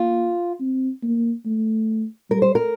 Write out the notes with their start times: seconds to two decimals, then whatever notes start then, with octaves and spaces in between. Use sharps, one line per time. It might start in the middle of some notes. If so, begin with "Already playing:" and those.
Already playing: A#3 F4
0.60 C4
1.03 A#3
1.46 A3
2.30 G3 A#4
2.42 C5
2.55 A#4